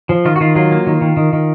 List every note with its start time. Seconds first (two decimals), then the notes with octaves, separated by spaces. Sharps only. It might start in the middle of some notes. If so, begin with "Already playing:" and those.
0.09 F3
0.25 D#3 F4
0.36 F#4
0.41 D#3 F4
0.55 F#3 F4
0.72 A#3
0.87 D#3
1.01 D#3
1.17 D#3
1.33 D#3